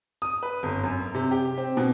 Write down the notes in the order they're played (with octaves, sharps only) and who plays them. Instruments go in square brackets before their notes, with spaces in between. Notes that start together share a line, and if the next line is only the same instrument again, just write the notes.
[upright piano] D#6
B4
G1
F#2
C3
G4
C4
B2